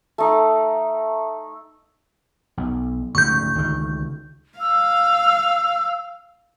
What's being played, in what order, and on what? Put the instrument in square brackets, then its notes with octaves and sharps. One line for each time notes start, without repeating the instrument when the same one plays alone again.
[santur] A3 D#4
[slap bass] B1
[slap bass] D2 G#2 C#3 [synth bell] C#6 G6
[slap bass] C#2 D3 D#3
[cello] F5 [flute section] E6